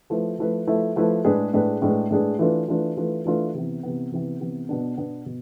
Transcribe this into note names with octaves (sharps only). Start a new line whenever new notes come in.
F3 A3 E4 B4
F3 A3 E4 B4
F3 A3 E4 B4
F3 A3 E4 B4
A2 G#3 D4 G#4 B4
A2 G#3 D4 G#4 B4
A2 G#3 D4 G#4 B4
A2 G#3 D4 G#4 B4
E3 A3 D4 F4 B4
E3 A3 D4 F4 B4
E3 A3 D4 F4 B4
E3 A3 D4 F4 B4
C3 E3 B3
C3 E3 B3
C3 E3 B3
C3 E3 B3
B2 B3 D4
B2 B3 D4
B2